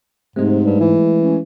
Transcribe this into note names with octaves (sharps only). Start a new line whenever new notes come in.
G#2 C3 G#3 A3
G2
E3
C#4